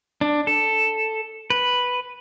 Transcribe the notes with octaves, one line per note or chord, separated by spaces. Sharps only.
D4
A4
B4